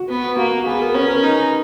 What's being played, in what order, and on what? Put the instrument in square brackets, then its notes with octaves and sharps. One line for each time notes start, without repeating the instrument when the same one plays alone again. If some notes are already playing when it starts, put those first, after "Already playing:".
Already playing: [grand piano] F#4
[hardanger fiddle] B3
[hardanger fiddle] A#3 [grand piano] F#4
[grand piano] F#4
[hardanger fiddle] B3 [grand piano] G#4
[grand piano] A#4
[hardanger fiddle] C#4 [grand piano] B4
[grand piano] A#4
[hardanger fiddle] D#4